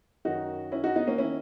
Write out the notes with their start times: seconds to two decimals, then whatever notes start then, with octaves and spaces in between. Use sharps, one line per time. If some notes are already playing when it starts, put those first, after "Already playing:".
0.25 F#2 D#3 D#4 F#4
0.72 C#4 E4
0.84 D#4 F#4
0.95 B3 D#4
1.07 A#3 C#4
1.18 D#3 C#4 E4